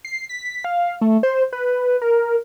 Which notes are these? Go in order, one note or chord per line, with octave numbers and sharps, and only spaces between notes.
C7
B6
F5
A3
C5
B4
A#4